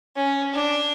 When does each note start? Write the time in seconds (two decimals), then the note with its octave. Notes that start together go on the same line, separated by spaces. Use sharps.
0.17 C#4
0.53 D4